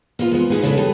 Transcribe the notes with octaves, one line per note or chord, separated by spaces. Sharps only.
A#3 B3 F4 F5
G#3 B3
D#4 E4 F#4 G#4 B4
C#3 G#3 D4 A4 B4
G3 G#4 A4